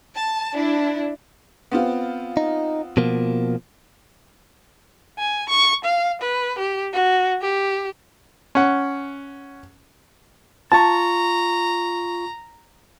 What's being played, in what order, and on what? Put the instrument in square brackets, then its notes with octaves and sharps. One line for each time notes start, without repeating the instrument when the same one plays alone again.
[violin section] A5
D4 E4
[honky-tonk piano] B3 C4 F4
[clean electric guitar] D#4
B2 F3 A#3
[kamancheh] G#5
C#6
F5
B4
G4
F#4
G4
[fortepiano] C#4 F#5
[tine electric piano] F4 C#6 [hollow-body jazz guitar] A5 [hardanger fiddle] A#5